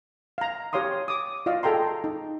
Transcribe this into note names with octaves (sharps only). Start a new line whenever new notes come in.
F5 A#5
G4 C#5 F5 C6 D#6
D6 D#6
F4 D5 D#5 F5
G#4 A4 G5 A#5 C6
D#4